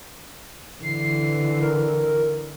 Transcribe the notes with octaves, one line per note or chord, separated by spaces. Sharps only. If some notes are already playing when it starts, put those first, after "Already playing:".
D3 E3 C7
A#4